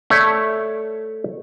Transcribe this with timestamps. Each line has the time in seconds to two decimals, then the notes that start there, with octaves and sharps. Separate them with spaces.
0.10 A3 C#5 D5 E5 A5